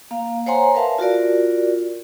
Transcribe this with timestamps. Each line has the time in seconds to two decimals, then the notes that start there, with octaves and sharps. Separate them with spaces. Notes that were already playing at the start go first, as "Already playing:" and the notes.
0.11 A#3 F5
0.46 C5 C#5 F#5 G#5 A#5 C6
0.74 A#4 B4 E5 F5 A5
0.98 F4 F#4 A#4 D5